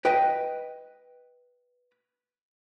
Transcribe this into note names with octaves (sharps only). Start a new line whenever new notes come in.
B4 D#5 G5